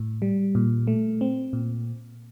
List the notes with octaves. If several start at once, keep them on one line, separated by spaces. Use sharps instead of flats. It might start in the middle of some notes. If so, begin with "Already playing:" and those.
Already playing: A2
G3
A#2
A3
C4
A#2